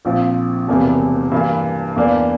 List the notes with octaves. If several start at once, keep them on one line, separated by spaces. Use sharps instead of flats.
A#1 A#2 F3 C4
E1 E2 C3 E3 A#3
G2 E3 A#3
E2 E3 A#3 D4